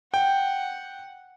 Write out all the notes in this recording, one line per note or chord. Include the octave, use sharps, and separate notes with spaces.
F#5 G5